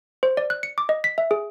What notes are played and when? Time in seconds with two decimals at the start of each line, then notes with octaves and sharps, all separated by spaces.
0.23 C5
0.37 D5
0.50 F#6
0.63 C#7
0.78 D6
0.89 D#5
1.04 B6
1.18 E5
1.31 G#4